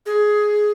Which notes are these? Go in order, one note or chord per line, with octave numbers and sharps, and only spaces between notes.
G#4